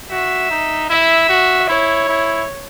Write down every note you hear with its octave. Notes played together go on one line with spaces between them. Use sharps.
F#4 E5
D#4
E4 E5
F#4
E4 C#5
E4